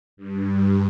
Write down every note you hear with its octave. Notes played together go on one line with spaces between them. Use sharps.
G2